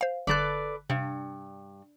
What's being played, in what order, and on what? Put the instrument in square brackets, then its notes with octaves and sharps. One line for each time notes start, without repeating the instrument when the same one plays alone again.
[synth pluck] C5 F5
[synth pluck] G1 D3 F#6 [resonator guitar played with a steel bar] A4 B4 D5
[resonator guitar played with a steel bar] G2 [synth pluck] C3